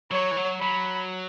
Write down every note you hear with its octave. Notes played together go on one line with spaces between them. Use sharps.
F#3 C#5
E3
F#3
F#3 B5